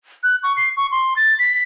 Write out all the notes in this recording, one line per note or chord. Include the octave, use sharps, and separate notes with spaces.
F#6
C#6
C7
C#6
C6
A6
B6